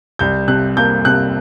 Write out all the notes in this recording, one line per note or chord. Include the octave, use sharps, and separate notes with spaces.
C2 G6
C3 F#6
A#3 G6
C3 F#6